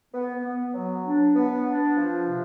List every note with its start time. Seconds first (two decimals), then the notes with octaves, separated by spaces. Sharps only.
0.14 B3
0.44 B3
0.75 F#3
1.05 D4
1.36 B3
1.66 D4
1.97 F3
2.28 C3